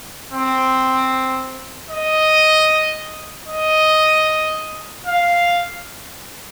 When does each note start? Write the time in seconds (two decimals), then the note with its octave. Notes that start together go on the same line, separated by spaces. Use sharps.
0.33 C4
1.90 D#5
3.48 D#5
5.06 F5